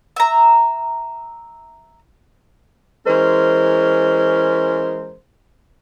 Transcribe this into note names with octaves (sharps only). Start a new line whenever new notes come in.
E5 A#5
E3 G#3 C#4 A#4 C5